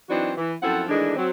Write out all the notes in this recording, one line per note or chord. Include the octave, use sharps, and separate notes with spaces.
E3 F#3 C4 D4 D#4 F#4
E3
F#2 F3 C4 E4 A4 F#5
D#3 E3 G#3 A3 D4
F#3 C4